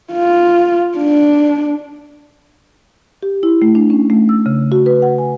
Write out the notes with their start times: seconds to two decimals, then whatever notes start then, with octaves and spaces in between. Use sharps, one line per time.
0.13 F4
0.98 D4
3.23 G4
3.43 E4
3.62 A3
3.75 D4
3.90 C#4
4.10 A3
4.29 E6
4.46 C#3
4.72 F#4
4.86 B4
5.02 F#5
5.18 G#5